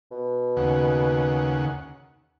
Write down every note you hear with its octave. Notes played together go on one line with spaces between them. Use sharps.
B2
D#2 C#3 F#5